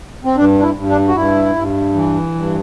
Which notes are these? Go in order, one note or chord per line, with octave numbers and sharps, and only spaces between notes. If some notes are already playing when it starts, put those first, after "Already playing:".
C4
G2 D4
D4
E4
G2
D4
F#4
G2 E4
G2
E3
G2